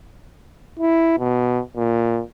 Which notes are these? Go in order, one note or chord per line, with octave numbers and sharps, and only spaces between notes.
E4
B2
A#2